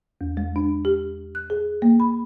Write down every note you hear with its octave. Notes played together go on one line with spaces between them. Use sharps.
E2
G#3
D4
G4
F#6
G#4
A#3
B5